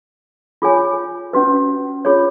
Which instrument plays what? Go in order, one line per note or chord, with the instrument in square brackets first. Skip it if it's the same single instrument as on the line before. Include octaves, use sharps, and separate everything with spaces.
[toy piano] F4 G#4 C#5 G#5
C#4 F#4 B4
F4 G#4 C#5